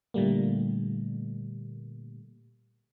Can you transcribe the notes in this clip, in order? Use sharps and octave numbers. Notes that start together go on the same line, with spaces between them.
A#2 D3 G3 A3 A#3